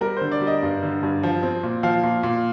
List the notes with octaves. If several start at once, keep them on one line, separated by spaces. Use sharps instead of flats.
G3 A#4
D3 C5
D5
G3
D#5
G2
D3
G2
F3
C4
A#2
F3 F5
A#2
A#2